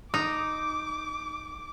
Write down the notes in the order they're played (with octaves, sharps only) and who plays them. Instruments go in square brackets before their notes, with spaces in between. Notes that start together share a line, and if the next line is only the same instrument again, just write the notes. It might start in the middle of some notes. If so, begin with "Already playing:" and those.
[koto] D#4 [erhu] D6 [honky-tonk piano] D#6